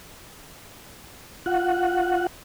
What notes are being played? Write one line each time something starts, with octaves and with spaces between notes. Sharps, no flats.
F4 F#5